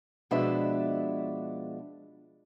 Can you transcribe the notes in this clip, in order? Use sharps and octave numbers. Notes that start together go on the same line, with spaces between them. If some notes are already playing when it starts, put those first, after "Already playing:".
B2 F3 G#3 D4 B4 E5